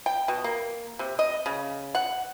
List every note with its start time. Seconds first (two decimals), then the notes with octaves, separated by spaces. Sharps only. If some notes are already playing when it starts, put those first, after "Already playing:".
0.06 G5
0.28 B2
0.44 A#3
0.99 C3
1.19 D#5
1.46 C#3
1.95 F#5